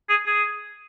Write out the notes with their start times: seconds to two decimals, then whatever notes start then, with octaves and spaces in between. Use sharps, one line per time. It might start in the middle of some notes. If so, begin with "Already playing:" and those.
0.09 G#4
0.26 G#4